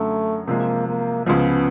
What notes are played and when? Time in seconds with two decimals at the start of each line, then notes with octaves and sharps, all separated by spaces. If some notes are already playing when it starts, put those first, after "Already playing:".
Already playing: F#2 D3 F#3 A3
0.48 C3 F3 G#3 A#3
0.87 A#3
1.26 C#2 C#3 F3 B3